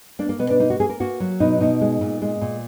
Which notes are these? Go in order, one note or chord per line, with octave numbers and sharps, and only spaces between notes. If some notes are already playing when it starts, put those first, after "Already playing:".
A#3 D4
A#3
B2 B3
D4
A#3 D#4
F#4
A#3 G#4
A#4
A#3 F#4
F#3
B2 D#4
B2 D#4
G#3
A#2
G#3
A#2